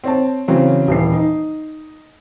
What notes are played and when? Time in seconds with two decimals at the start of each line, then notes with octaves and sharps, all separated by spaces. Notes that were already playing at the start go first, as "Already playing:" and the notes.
0.04 C4 C#5 A5
0.48 C#3 E3 F#3 C4 C#4
0.88 D#1 E3 C7
1.13 D#4